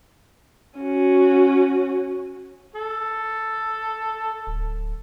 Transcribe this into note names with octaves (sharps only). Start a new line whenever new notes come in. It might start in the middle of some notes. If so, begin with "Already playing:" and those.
C#4 F#4
A4
D1